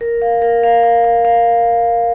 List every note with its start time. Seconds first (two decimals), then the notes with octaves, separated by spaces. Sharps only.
0.01 A#4
0.22 F5
0.42 A#4
0.63 F5
0.84 F5
1.04 F5
1.25 F5